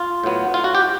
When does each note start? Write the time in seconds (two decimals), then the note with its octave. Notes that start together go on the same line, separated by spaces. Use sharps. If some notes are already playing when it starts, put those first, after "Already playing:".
Already playing: F4
0.23 A2 F#3 B3
0.54 F4
0.64 F#4
0.75 G4